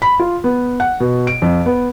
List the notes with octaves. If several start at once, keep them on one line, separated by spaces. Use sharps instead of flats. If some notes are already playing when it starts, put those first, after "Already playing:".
B5
F4
B3
F#5
B2
D7
F2
B3